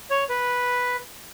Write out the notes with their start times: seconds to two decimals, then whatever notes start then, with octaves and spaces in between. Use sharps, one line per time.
0.10 C#5
0.29 B4